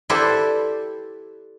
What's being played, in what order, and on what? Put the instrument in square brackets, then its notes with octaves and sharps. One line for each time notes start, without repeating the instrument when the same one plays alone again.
[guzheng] E4 G4 A4 B4 C5 D5